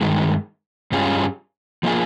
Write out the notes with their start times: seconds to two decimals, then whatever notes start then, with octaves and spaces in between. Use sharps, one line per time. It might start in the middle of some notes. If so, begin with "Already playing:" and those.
0.01 G2 D#3 G#3
0.92 G2 G3 C#4 F4 G#4
1.83 F3 A#3 F4 G#4